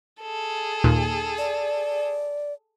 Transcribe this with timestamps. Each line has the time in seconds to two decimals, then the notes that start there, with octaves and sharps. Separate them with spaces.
0.22 G#4 A4
0.84 D#2 A#2
1.38 D5